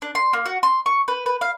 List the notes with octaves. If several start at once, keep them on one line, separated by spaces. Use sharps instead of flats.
D4
C6
A#3
F#4
C6
C#6
B4
B4
F5